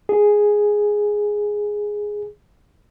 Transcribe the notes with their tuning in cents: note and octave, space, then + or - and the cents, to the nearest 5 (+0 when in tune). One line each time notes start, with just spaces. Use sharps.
G#4 +0